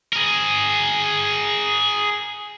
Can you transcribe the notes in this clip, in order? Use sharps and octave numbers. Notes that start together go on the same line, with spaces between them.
G#4 A#4